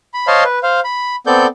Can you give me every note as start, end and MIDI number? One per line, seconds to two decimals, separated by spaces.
0.14 0.27 83
0.27 0.44 72
0.27 0.44 73
0.27 0.44 75
0.27 0.44 77
0.27 0.44 81
0.27 0.44 84
0.45 0.59 71
0.63 0.80 72
0.63 0.80 77
0.84 1.16 83
1.27 1.47 59
1.27 1.47 60
1.27 1.47 69
1.27 1.47 74
1.27 1.47 91